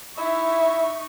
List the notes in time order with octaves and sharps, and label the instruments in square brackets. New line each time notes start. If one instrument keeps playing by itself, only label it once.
[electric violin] D#4 C#6 [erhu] E4 [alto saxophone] E5